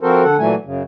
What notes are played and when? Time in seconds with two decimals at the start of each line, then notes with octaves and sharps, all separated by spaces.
0.01 F3 C4 F#4 A4 A#4 C5
0.24 D3 A4 F#5
0.39 A#2 E3 F#3 A3 G#5
0.65 F#2 C#3